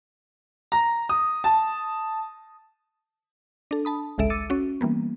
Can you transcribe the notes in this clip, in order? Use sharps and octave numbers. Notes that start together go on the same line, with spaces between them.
A#5
D#6
A5
D4 A4
A5 B5 D#6
G#1 C#2 G#3 A4 E5 D7
D6 E6 A6 C#7 D#7
C#4 F#4
E3 G3 A#3 B3